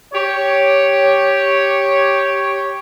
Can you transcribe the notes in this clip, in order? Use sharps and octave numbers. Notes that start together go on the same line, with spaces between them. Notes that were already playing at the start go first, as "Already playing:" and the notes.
G4 C#5